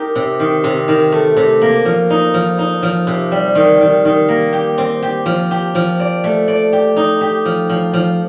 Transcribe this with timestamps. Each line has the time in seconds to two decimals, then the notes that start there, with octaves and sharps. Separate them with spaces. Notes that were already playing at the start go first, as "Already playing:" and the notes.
Already playing: D#4 G4 A#4
0.16 C3
0.40 D#3
0.64 C3
0.88 D#3
1.12 A3
1.37 C3
1.62 A#3
1.85 F3
2.10 D#4
2.34 F3
2.59 D#4
2.83 F3
3.07 C3
3.32 G3
3.55 D#3
3.81 D#3
4.05 D#3
4.29 A#3
4.53 G4
4.78 C4
5.03 G4
5.26 F3
5.51 G4
5.75 F3
6.00 D5
6.24 A3
6.48 D5
6.73 G4
6.96 D#4
7.21 G4
7.45 F3
7.69 F3
7.94 F3